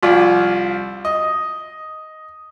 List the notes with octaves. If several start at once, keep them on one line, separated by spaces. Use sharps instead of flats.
C2 F3 F4 D5
D#5